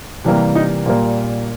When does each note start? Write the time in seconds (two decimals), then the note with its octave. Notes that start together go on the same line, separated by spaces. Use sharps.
0.24 C3 E3 G3 A#3
0.55 D#4
0.86 A#2 G3 A#3